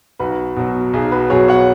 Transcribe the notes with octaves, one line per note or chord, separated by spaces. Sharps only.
B1 F#4 B4
B2 F#3
B1 G#4
F#4 B4
B2 F#3 G#4 C#5
C#5 F#5